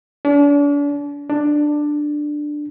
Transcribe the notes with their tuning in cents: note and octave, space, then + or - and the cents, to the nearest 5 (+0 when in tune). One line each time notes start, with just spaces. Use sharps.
D4 -40
D4 +10